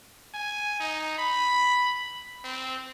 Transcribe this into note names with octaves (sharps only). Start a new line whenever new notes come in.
G#5
D#4
B5
C4